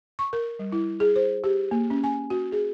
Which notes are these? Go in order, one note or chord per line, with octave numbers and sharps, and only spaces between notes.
C#6
A#4
G3
E4
G#4
C5
G4
A#3
C#4
G#5
F#4
G#4